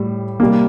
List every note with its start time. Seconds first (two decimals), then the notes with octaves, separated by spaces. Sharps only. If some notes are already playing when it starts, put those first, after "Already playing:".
Already playing: A2 G3
0.40 C3 G3 A#3